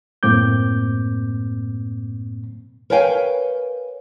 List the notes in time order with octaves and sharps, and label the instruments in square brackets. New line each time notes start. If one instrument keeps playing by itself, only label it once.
[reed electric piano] F#2 A2 A#3 C4 D6 G6
[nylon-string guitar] A#4 B4 C#5 F5 G5 G#5